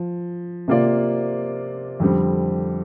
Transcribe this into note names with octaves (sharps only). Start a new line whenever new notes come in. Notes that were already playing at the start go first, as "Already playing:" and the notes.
Already playing: F3
C3 A#3 F4 D5
F2 D3 G3 C4